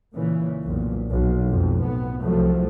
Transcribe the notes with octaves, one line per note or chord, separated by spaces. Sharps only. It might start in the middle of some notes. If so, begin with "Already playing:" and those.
A#2 C#3 E3
B1 F2 A#2
B1
F2 G#2
A2 B3
C2 F3 F#3 A3